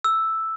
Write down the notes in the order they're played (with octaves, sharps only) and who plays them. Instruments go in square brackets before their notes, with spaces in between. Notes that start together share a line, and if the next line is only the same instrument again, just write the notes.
[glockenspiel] E6